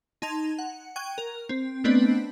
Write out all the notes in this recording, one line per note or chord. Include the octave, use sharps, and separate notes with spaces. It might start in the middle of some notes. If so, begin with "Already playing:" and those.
D#4 A5 C6 G#6 F7
F#5
G5 C#6 F#6 G#6 D#7
A#4
C4
A3 B3 C4 D4 B4 D#5